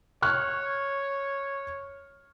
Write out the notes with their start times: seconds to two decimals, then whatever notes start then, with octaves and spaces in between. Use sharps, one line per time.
0.22 C#5 C#6 F6 F#6